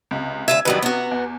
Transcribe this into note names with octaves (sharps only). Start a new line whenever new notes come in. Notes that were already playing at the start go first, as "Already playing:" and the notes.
C#2 C3
D2 F4 E5 G#6
A1 D#3 F#3 G3 B4
C3 B3 F#4
E2